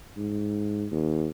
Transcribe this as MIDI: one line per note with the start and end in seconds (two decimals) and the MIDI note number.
0.17 0.86 44
0.92 1.28 39